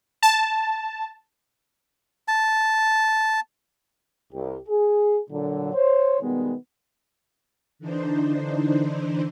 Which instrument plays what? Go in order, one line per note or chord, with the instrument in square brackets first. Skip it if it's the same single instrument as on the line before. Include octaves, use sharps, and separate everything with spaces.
[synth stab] A5
[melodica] A5
[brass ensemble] C2 G4
G#4
A#2 D3 F#3
C5 C#5
B2 D#3 G3 G#3 B3
[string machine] D3 E3 D4 D#4 C5